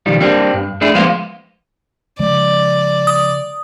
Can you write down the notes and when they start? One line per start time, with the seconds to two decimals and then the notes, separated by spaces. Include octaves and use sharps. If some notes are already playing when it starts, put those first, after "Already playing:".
0.06 B1 D#3 F3 G3
0.21 G3 A#3 C4 D4
0.54 G2
0.81 A3 D4 E4 G#4
0.95 F3 G#3 A#3 B3 C5 F5
2.19 C#3 F3 G#3 D5
3.07 D#6